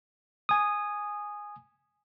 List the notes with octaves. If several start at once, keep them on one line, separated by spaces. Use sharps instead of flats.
G#5 D#6